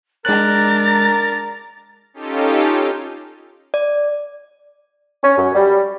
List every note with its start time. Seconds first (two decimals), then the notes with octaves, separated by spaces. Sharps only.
0.25 G#3 D4 A#4 A#5 F#6 A6
2.14 C#4 D#4 F4 G4 A4
3.74 D5
5.24 C#4
5.38 F#2
5.55 G3